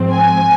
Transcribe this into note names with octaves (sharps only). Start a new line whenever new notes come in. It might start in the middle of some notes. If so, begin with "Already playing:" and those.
Already playing: G#2 F3 C4
G#5